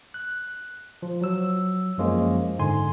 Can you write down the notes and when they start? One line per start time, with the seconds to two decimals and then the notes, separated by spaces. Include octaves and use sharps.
0.14 F#6
1.03 F3
1.21 F#3 E6
1.98 F#2 F3 G#3 A#3 C#4
2.59 G#2 D3 G#5 C6